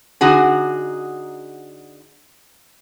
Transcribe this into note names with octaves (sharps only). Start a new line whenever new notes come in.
D3 D#4 F#4 G#4